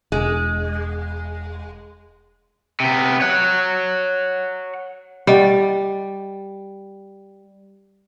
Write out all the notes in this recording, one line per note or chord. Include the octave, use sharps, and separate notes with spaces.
E1 G#3
C3 B3
C#5 F#5
G3 G4 D#5 F#5